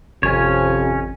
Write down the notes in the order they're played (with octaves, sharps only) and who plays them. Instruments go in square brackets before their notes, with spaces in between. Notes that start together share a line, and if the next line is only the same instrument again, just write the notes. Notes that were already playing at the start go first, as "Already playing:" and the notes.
[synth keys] G#1 G#5 [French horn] F2 [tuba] C3 [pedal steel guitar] C#4 C#5